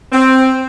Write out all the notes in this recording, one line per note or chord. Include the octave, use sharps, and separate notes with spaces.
C4